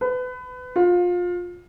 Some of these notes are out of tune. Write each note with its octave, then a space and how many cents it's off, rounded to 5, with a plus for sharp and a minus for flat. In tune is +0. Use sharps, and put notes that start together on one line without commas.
B4 +25
F4 +25